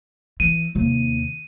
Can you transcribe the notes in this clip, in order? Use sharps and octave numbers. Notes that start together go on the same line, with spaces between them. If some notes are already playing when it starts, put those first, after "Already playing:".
E3 D#7
D#2 C3